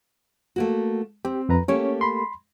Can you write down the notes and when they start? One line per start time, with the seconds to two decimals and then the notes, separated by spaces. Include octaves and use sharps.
0.56 A3 A#3 F#4
1.25 C4 G4
1.49 F2 B4 A#5
1.68 A3 A#3 C#4 G4 C#5
2.01 B5 C6